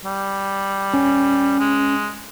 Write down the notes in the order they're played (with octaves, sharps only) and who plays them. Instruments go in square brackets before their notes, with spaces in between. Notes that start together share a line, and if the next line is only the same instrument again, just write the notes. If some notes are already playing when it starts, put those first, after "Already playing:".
[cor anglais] G3
[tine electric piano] C#4
[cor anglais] G#3